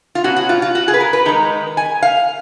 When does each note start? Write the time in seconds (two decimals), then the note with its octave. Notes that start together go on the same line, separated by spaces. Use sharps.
0.15 F4
0.24 B2 F#3 C#4 F#4
0.36 F#4
0.49 F4
0.62 F4
0.75 F#4
0.88 G#4
0.94 B4
1.00 A#4
1.13 B4
1.25 D#3 G#3 D#4 A#5
1.77 G#5
2.02 F5